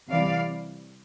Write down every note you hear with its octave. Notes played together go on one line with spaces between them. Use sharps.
C3 E3 G3 D5 F5